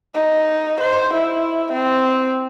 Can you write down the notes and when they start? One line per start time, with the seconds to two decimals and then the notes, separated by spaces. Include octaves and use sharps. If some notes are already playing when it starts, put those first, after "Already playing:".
0.14 D#4
0.80 C5
1.13 E4
1.73 C4